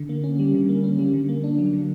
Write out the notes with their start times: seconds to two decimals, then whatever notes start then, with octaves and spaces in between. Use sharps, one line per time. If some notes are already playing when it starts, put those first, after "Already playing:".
Already playing: D3
0.09 A#3
0.24 C#4
0.39 G3
0.54 D3
0.69 A#3
0.84 C#4
0.99 G3
1.13 D3
1.29 A#3
1.44 D4
1.58 F#3
1.73 D3